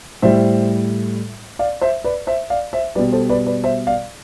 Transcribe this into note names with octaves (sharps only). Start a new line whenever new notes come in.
A2 G3 C5 E5
D5 F5
C5 E5
B4 D5
C5 E5
D5 F5
C5 E5
B2 G3 B4 D5
A4 C5
B4 D5
B4 D5
C5 E5
D5 F5